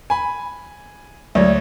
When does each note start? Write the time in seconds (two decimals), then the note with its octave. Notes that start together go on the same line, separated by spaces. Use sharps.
0.10 G#5 B5
1.35 D2 F#3 G#3 C#5 D5